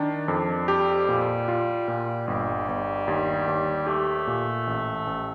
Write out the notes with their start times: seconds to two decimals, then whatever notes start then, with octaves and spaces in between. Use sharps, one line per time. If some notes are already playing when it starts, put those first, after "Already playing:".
Already playing: D#3 D4
0.28 F2
0.68 G3 G4
1.09 A#2
1.48 F4
1.88 A#2
2.27 G1 G3
2.68 G1
3.08 D#2
3.48 D#2
3.87 A3 G4
4.27 A#2
4.67 A1
5.07 A1